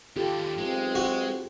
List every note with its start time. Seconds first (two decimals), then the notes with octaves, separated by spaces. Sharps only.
0.16 D#2 D3 F4 G4 A4
0.58 B1 G#3 C4 F4 G4 G#4
0.95 F#4